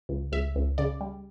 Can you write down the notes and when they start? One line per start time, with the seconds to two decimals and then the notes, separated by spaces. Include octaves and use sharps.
0.09 C#2
0.32 C#2 E5
0.56 C#2
0.78 C#3 D5
1.01 G3